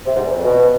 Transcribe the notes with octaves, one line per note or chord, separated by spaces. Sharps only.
C3
G#2
E2
F2
B2